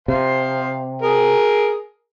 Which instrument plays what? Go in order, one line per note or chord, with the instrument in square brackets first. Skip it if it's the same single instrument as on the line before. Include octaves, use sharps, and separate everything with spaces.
[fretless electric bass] C3 [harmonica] C5 F5
[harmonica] G#4 A#4